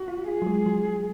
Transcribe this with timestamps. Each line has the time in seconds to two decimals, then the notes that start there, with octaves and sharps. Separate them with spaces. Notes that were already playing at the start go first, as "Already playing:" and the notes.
Already playing: F#4
0.08 F4
0.27 F4 G#4
0.42 F#3
0.47 G#3
0.66 F#3